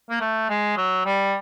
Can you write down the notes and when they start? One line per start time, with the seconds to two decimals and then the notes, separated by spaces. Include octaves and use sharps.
0.10 A#3
0.21 A3
0.49 G#3
0.77 F#3
1.05 G3